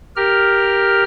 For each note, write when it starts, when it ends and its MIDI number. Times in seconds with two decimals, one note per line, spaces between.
0.16 1.04 67
0.16 1.04 70
0.16 1.04 89